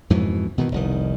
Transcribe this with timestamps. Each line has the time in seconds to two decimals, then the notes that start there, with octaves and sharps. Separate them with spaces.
0.10 F2 G#2 B2 E3
0.58 B2 D#3 E3
0.72 F1 C2 D#3